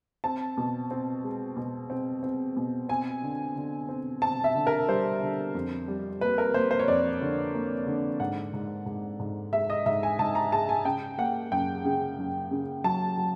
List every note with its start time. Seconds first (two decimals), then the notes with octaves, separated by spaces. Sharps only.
0.24 C4 A5
0.57 B2
0.91 C4
1.24 G#3
1.57 B2
1.90 C4
2.23 C4
2.57 B2
2.89 C4 G#5
3.23 D3
3.56 D3
3.89 C4
4.22 C4 A5
4.44 E5
4.55 D3
4.67 A#4
4.88 G3 C5
5.21 D3
5.55 F2
5.88 G3
6.21 A#3 B4
6.38 A#4
6.54 A#3 C5
6.71 C5
6.80 C#5
6.88 F2 D5
7.21 D3
7.54 A#3
7.87 D3
8.20 G#2 F#5
8.54 G#2
8.86 G#2
9.20 G#2
9.53 G#3 E5
9.70 D#5
9.86 G#2 E5
10.03 G#5
10.19 G#2 A5
10.35 A#5
10.52 G#3 A5
10.69 G#5
10.85 C#3 G5
11.18 A#3 F#5
11.52 F#2 G5
11.85 C#3
12.18 F#2
12.51 C#3
12.84 F#3 A5
13.18 F#3